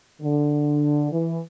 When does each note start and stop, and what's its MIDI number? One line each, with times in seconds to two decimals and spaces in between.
0.21 1.07 50
1.12 1.39 52